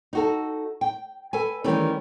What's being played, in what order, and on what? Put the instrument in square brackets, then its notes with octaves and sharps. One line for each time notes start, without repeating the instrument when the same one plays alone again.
[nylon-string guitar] D#4 F#4 A4
G5
A4 B4 G#5
D#3 E3 G3 A3 C#4